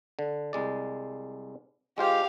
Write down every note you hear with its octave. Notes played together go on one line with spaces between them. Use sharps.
D3
C2 G#3 D5
G#3 F4 G4 C5 F5